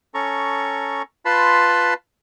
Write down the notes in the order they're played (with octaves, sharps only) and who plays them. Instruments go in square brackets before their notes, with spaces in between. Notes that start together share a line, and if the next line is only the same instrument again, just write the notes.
[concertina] C#4 A4 A#5 C#6
F4 B4 A5 B5 C6